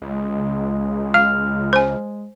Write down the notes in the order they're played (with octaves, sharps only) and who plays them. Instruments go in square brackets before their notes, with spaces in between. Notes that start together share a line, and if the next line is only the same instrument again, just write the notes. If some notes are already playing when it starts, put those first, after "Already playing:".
[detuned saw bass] C#2 [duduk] G#3
[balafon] F5 [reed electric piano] F6
[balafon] C5 G#5